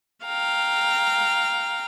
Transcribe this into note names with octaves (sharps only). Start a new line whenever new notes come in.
F5 G5 A#5